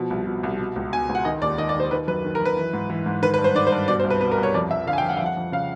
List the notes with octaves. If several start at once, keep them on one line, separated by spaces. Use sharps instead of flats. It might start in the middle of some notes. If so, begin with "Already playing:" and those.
Already playing: B2 F3
C2
B2
C2
B2
C#2
B2 G#5
C#2
F#5
D#3 D#5
D#2 D5
D#3 D#5
D5
D#2 C5
D#3 B4
F#2 B4
D#3
A#4
F#2 B4
E3
G#2
E3
G#2
D#3 B4
B4
G2
C5
D#3 D5
C5
G2
B2 D5
C5
C2
B4
B2 B4
A#4
C2
C#5
F2 D5
F2 E5
D3 F5
G#5
G5
F3
F#5
F2 F5
F#5
F2
C#3 F5